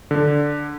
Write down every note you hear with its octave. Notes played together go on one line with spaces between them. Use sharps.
D3